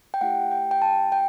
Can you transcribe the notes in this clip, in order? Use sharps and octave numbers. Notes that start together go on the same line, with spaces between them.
G5
A3 E4 G4 F#5
G5
G5
A5
G5